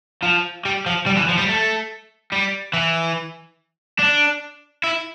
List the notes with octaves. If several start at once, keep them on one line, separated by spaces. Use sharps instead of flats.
F3
G3
F3
G3
E3
F3
G3
A3
G3
E3
D4
E4